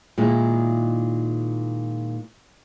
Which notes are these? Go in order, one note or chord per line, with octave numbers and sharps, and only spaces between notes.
A#2 D#3 G#3 A#3 E4